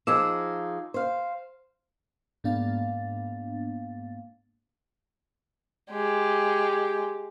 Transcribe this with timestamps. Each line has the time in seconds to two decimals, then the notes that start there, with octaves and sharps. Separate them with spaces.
0.07 F3 D#4 G#4 D6 E6 E7
0.94 C5 F5
2.44 G#2 A#3 B3 D4 F5 A6
5.91 G#3 G4